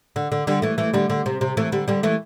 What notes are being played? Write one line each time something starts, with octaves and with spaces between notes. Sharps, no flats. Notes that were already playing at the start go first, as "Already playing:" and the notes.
D3
D3
D3 G3
E3 A3
E3 A3
D3 G3
D3
C3
C3
E3 A3
D3 G3
D3 G3
E3 A3